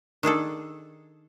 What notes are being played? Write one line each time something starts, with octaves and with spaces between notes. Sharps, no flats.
D#3 D4 G#4 A4